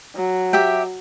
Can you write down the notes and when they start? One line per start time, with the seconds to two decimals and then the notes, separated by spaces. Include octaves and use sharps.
0.15 F#3
0.53 G4 E5 G5